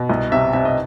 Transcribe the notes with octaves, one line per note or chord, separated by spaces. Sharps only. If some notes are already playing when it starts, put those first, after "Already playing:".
Already playing: B2
C2 D#5
C3 E5
C3 E5
D#5